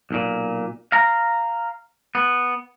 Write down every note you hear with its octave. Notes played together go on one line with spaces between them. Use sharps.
B1 A#2
F5 A#5
B3